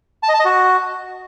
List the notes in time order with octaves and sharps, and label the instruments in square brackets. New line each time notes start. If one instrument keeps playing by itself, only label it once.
[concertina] A5
D#5
A5
D#5
F#4